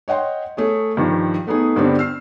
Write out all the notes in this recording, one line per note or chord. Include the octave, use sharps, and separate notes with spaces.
C#5 D#5 F#5 G5 C6
A3 G#4 C#5
G2 D#3 F3
A3 B3 D#4 G#4
G2 D3 G3 B3 C4 D4
E6 F6 C7